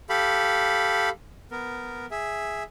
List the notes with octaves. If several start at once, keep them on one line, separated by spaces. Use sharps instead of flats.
G4 A4 F5 B5
B3 A#4
G#4 E5